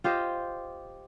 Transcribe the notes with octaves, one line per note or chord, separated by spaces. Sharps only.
F4 G4 C5 D#5